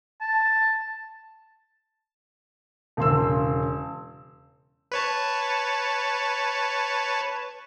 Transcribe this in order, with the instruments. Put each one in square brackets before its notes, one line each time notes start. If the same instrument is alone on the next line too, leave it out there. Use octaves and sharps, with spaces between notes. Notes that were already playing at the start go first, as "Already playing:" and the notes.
[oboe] A5
[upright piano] E1 C#3 C6 E6
[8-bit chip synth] B4 C#5 A5